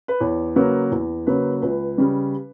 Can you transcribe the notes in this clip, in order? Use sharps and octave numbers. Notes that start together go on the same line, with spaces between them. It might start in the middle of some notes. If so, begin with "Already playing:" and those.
B4
E2 C#5
C#3 F#3 A#3 B4
E2
C#3 F#3 A#3 B4
C#2 B4
C#3 G3